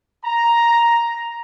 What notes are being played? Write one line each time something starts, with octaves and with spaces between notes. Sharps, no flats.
A#5